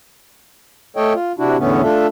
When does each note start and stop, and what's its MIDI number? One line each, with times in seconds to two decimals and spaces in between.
0.97 1.13 57
0.97 1.13 69
0.97 1.13 73
0.97 1.13 75
0.97 1.13 79
1.14 1.32 65
1.38 1.57 48
1.38 1.57 62
1.38 1.57 64
1.38 1.57 66
1.58 1.82 40
1.58 1.82 45
1.58 1.82 50
1.58 1.82 57
1.58 1.82 59
1.58 1.82 61
1.82 2.07 57
1.82 2.07 62
1.82 2.07 65
1.82 2.07 69
1.82 2.07 76